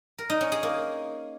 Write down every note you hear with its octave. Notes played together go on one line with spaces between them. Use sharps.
A#4
D#4
C#4
G#4
A#3